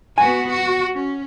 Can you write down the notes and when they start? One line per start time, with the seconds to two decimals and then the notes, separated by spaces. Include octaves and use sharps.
0.18 B3 F#4 G#5
0.48 F#4
0.94 C#4